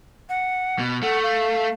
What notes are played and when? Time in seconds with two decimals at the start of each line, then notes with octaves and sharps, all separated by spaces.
0.29 F#5
0.79 B2
1.03 A3 F#5
1.23 F5